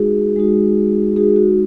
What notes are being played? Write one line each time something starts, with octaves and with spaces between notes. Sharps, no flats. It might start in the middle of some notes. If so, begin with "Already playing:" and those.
Already playing: G#3 D#4 F#4 G#4
G#3 D#4 F#4
G#3 D#4 F#4 G#4
F#4